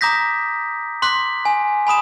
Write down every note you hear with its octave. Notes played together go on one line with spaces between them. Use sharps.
A#5 D6 D#6 G6 A#6 B6
C6 D6 F#6 B6
G#5
G#5 B5 D#6 E7